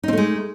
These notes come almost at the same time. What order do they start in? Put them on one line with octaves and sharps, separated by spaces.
D#4 C4 A3 G#3